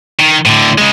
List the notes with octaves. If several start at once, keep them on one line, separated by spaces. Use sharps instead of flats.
D#3
A2 D3
C#3 G#3